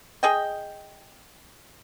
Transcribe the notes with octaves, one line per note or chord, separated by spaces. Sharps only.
G#4 D#5 G5